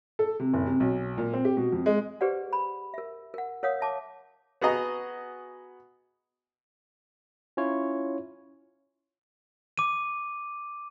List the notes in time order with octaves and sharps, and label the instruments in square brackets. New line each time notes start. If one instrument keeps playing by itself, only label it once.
[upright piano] A4
C3
F#1
C3
B1
A#2
C4
G4
B2
F2
G#3
[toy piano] G4 G#4 B4 C5 D5 F#5
B5
A#4 E5
A#4 F#5
A#4 C#5 F5 F#5 D#6
E5 A5 D6
[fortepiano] B3 F#4 G#4 D#5 A#5
[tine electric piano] C#4 E4 F4 C#5
[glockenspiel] D6 D#7